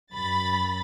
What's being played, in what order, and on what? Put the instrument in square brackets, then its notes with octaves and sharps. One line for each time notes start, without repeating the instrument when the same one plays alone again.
[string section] F#2 B5 A6